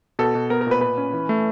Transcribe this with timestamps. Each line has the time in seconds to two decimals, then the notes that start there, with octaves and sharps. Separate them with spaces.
0.19 B2 A4
0.35 B2
0.50 B3 A#4
0.61 A#4
0.67 A#2 B4
0.81 A#2 B4
0.98 C#4
1.13 E3
1.29 A3